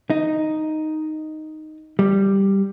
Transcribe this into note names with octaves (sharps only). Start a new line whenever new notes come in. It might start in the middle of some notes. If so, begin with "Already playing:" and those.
D#4
G3